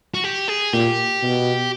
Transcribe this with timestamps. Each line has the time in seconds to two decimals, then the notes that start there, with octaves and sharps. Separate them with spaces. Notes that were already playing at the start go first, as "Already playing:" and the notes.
0.14 F#4
0.24 G4
0.48 G#4
0.73 A#2 G4
1.23 B2